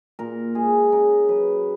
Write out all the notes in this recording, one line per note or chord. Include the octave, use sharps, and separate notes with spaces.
A#2 A#4
G#3 G#4
C#3 A#4
F#3 B4